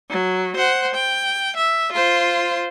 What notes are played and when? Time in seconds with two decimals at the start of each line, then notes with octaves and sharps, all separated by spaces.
0.10 F#3
0.57 C5 F#5
0.95 G5
1.57 E5
1.93 F4 C5